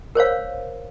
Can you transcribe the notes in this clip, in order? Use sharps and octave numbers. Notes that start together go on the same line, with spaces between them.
A#4 C5 C#5 F5